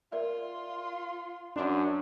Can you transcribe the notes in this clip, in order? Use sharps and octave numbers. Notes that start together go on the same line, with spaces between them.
F4 A#4 D5 E5 C6
F#2 D4 C6